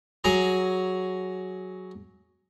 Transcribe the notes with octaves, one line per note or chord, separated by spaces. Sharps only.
F#3 G#4 A#5